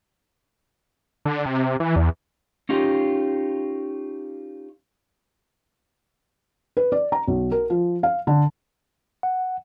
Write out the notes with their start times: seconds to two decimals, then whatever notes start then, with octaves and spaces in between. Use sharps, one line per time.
1.25 D3
1.46 C3
1.80 E3
1.96 E2
2.69 C#4 D#4 F4 G4
6.77 B4
6.92 D5
7.12 A#5
7.27 B1
7.52 A#4
7.70 F3
8.03 F5
8.27 D3
9.23 F#5